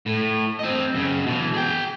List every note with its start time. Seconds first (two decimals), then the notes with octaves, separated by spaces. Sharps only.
0.06 A2
0.59 C4 D#5
0.94 F#2 C#3
1.26 B2 E3
1.54 G#4 G5